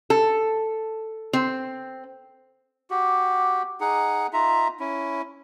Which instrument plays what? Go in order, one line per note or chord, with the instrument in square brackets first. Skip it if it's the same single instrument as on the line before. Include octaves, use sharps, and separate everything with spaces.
[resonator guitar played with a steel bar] A4
C4
[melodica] F#4 G4
D#4 G#4 F#5
D#4 F4 E5 A#5
C#4 E4